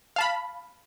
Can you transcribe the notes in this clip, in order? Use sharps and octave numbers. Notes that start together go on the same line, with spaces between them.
F5 A5 B5